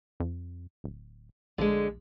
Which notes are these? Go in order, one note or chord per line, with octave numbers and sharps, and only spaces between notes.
F2
D1
A#1 D3 G#3